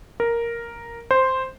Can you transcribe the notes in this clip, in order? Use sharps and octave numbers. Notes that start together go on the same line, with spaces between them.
A#4
C5